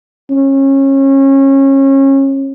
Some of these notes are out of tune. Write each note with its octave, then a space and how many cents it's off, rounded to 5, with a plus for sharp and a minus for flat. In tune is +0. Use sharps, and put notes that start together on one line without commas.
C#4 -30